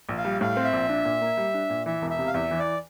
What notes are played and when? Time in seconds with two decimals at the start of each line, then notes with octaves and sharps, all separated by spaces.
0.09 A#1
0.17 F5
0.25 G3
0.41 A2 F5
0.57 C4
0.64 E5
0.73 A#1
0.89 D4
1.05 A#2
1.21 A#3
1.37 G3
1.54 D4
1.70 A#2
1.86 E3 E5
2.02 E1
2.10 E5
2.19 C3
2.27 F5
2.34 E2 E5
2.51 E3
2.59 D5